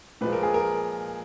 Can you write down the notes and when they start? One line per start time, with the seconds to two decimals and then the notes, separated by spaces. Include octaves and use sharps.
0.21 A#2 F3 G#3 B4
0.33 A#4
0.43 G#4
0.54 A#4